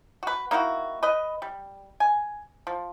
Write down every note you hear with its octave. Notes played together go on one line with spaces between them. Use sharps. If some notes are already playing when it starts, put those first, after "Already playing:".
F#4 B4
A#3 D#4 E4 F#4
B4 D#5
G3
G#5
F3